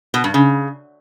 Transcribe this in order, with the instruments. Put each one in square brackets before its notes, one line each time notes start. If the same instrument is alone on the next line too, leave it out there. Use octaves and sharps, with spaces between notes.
[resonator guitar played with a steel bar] B2
G2
C#3